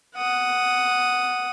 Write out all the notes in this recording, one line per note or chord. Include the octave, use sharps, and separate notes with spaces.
F#5 D#6